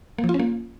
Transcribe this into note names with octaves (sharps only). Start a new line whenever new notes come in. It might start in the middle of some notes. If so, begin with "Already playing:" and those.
A#3
F3
F4
C#4
A#3